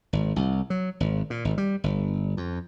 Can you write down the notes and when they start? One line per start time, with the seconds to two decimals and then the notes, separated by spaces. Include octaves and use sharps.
0.13 G#1
0.36 C2
0.70 F#3
1.00 G#1
1.30 A#2
1.45 G#1
1.58 G3
1.84 G1
2.37 F2